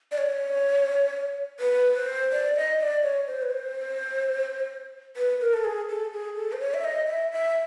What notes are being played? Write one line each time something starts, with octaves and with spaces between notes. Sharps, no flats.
D5
C#5
B4
C5
D5
D#5
D5
C#5
C5
B4
C5
B4
A#4
A4
G#4
A4
G#4
A4
C5
C#5
E5
D#5
E5
E5